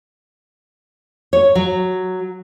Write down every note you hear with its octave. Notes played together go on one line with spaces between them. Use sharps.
C#5
F#3